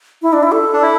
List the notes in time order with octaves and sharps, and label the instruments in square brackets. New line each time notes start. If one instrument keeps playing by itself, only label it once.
[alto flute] E4
D4
E4
A4
[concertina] D4
E4